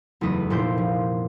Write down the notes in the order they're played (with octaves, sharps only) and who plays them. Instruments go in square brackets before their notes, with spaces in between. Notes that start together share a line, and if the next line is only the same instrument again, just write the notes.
[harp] F#1 E2 A3 D#4 B4 D#6
F1 A#2 E4 C5 D6 G6
F3